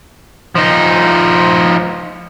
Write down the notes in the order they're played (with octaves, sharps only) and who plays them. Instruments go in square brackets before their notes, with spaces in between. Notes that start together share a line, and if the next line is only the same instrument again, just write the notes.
[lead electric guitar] F3 D#4